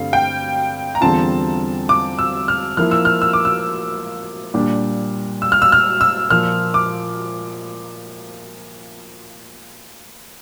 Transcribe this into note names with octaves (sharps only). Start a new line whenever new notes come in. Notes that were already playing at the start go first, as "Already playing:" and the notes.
Already playing: G2 D3 A3 C4 F5
G5
A#5
E2 D3 G3 C4 F4 A5
D6
E6
F6
F3 A#3 E4 F6
E6
F6
E6
D6
E6
A#2 G3 D4 G4
E6
F6
E6
F6
E6
A#2 F3 A#3 F4 F6
D6